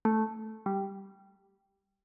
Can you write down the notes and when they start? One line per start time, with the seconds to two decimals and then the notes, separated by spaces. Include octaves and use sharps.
0.05 A3
0.66 G3